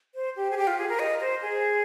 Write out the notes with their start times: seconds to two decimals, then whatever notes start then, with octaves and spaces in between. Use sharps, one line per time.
0.15 C5
0.36 G4
0.51 G#4
0.57 G4
0.67 F4
0.78 G#4
0.89 A#4
0.99 D#5
1.20 C5
1.42 G#4